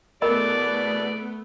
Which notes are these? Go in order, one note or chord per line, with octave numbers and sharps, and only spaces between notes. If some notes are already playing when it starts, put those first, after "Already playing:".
E2 B2 A3 B3 A#4 D5 D#5 B5